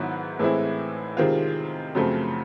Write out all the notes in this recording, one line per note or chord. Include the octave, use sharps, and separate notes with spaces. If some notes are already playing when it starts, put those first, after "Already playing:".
Already playing: G#2 D#3 F#3 B3 E4
A2 E3 G#3 C4 E4
C3 D#3 G#3 C4 F4
F#2 C#3 F3 A3 C4